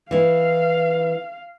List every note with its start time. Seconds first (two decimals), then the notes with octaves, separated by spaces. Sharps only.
0.11 E3 E4 F5